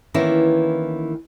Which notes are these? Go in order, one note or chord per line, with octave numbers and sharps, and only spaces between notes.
D#3 E3 A#3 B3 C#4 E4